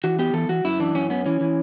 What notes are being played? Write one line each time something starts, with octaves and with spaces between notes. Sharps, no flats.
E3 F#4
B3 G4
E3 A4
E3 F#4
F#2 E4
E3 D4
F#2 C#4
B3 C#4
E3 C#4
E3